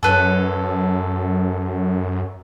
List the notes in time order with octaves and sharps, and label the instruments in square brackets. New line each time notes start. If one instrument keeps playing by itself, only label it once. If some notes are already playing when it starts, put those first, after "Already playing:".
[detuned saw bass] F#2 [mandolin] A4 B4 C#5